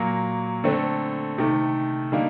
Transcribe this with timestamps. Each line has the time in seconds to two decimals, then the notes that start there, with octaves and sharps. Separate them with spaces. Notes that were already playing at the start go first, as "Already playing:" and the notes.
Already playing: A#2 F#3 A#3
0.64 D3 A3 C4
1.38 C3 D#3 A3
2.12 D3 G3 A#3 D#4